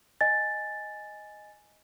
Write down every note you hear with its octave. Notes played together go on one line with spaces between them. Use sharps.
D#5 G#5 A6